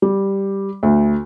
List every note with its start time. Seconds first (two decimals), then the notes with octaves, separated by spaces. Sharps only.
0.02 G3
0.83 D2